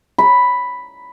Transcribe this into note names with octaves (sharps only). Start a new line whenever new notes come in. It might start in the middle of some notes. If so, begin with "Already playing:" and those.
B5